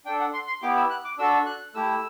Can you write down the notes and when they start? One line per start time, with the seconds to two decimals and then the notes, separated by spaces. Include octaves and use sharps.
0.05 D4 G5
0.09 A4
0.20 F#5
0.33 C6
0.47 C6
0.63 B3 E4 G4 D6
0.77 E6
0.90 F#6
1.05 D6
1.18 D4 F#4 A4 E6
1.46 F#6
1.74 A3 E4 G4 E6